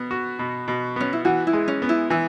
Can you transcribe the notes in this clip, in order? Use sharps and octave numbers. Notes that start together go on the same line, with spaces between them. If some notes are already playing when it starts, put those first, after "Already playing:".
Already playing: B2 B3
F#4
B2
B2
B3 C#4
E4
E3 F#4
E4
G#3
C#4
B3
E4
E3 E4